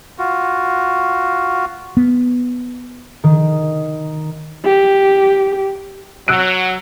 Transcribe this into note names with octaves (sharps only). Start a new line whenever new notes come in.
F4 F#4
B3
D#3
G4
F#3 E6 F#6 D7